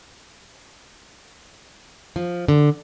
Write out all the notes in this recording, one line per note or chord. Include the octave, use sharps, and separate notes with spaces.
F3
D3